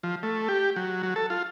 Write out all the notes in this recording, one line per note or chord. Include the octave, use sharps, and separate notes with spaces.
F3
A3
G4
F#3
F#3
A4
F4